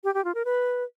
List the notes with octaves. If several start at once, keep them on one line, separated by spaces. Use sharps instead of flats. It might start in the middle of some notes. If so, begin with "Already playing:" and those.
G4
G4
F4
A#4
B4